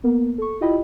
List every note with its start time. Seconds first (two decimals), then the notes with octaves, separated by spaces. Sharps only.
0.04 A#3 B3 A#4
0.38 A4 C#6
0.61 E4 F4 G4 D#5 G5 B5